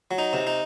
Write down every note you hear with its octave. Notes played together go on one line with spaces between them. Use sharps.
F#3
D#4
C3
D#4